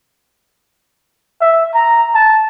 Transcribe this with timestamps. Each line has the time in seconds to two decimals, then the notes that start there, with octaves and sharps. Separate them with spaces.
1.41 E5
1.74 A#5
2.14 A5